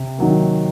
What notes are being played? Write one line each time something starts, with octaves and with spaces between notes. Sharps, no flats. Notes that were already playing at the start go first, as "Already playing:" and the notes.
Already playing: C3
D#3 F#3 A#3